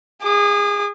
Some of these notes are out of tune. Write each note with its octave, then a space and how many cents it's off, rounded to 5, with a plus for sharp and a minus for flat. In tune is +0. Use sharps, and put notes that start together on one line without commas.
G#4 -25 D6 +25